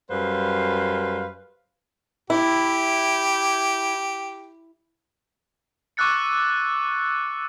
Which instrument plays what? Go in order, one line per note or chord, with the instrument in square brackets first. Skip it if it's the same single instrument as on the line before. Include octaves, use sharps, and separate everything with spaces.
[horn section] F#2 G3 B4 C5 F5
[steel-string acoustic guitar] E4 [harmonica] G4
[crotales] C#6 D6 E6 F#6 A6 C#7